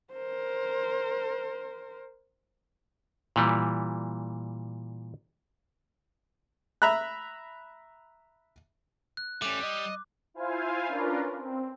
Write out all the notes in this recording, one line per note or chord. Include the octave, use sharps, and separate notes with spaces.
A#4 C5
A#2 E3 G3
E5 A#5 B5 F#6
F#6
G3 A3 C#4 D6
D#5
E4 F4 C5 F5 G#5
C#4 D4 F4 A#4 B4
C4